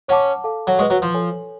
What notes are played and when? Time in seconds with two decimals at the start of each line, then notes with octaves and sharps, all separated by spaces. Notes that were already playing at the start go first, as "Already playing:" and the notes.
0.08 C#4 C#5 F#5 A5 D6
0.44 A4 F5 A5 D6
0.67 F#3
0.79 G#3 B4 F#5 C#6
0.90 F#3
1.02 F3
1.14 A4 C#5 G#5